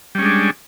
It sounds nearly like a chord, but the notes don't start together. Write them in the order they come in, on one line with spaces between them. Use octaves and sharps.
G3 C#4 G#3 D4